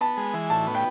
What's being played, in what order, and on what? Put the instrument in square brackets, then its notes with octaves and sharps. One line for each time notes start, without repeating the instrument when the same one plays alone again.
[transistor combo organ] B3 [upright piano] A5
[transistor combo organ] G#3
E3
[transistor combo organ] A2 [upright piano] A5
[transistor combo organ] B3
[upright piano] G5